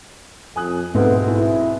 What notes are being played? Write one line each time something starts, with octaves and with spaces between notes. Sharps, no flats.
F2 G#5 D#6 F#6
B1 G#2 G#3 A3 B3 C4
E4 G#5